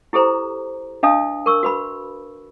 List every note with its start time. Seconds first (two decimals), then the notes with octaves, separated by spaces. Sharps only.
0.13 E4 G4 A4 C5 A#5
1.03 D4 D#5 F5 A5 D#6
1.46 A#4 C#6 E6
1.63 F#4 B4 B5